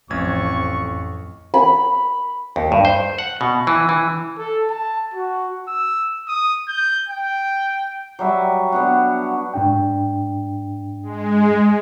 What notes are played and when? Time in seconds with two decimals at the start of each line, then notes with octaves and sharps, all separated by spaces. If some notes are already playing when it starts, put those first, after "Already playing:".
0.10 A1 F2 C#6 G#6
1.54 B5
2.56 D#2
2.72 G2
2.85 C5
3.18 F#5
3.41 B2
3.67 E3
3.89 E3
4.38 A4
4.70 A5
5.14 F#4
5.68 E6
6.28 D#6
6.68 G6
7.09 G5
8.19 F#3 G3 E5
8.72 B3 D4 F#4
9.54 G#2 D4 G5
11.03 G#3